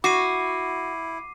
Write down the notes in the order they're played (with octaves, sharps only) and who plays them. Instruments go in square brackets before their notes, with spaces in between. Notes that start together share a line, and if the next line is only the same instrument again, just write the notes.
[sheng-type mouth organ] E4 [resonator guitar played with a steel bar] F#4 [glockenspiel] D6 C7 D#7